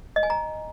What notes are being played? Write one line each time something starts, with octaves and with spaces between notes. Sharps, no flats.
D#5
G#5
A#5